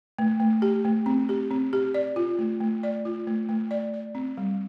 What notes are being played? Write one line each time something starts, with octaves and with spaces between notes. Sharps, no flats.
A3
A3
G4
A3
C4
G4
C4
G4
D5
F4
A3
A3
D5
F4
A3
A3
D5
D5
C4
G3